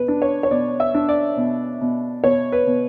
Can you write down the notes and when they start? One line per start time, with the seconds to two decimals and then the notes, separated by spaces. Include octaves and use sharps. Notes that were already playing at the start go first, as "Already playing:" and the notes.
Already playing: B2 B4
0.08 D4
0.22 C#5
0.43 C#5
0.51 B2 D5
0.80 E5
0.94 D4
1.09 D5
1.37 B2
1.81 B2
2.24 B2 C#5
2.52 B4
2.67 B2